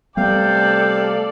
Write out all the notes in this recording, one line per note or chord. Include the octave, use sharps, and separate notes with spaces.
C3 G3 A3 B3 A4 D5 F5 G5